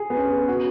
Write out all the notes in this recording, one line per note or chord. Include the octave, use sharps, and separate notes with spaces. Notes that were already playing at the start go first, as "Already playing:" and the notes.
Already playing: G#4
B3
C#4
F#4